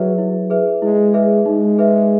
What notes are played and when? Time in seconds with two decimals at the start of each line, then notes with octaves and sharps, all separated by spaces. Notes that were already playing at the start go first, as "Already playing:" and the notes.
Already playing: F#3 E4 G#4 B4 E5
0.18 E4
0.50 G#4 B4 E5
0.82 G#3 E4
1.14 G#4 B4 E5
1.46 G#3 D#4
1.78 G#4 B4 E5